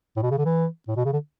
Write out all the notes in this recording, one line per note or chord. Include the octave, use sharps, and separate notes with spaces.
A2
B2
C#3
D3
E3
A2
B2
C#3
D3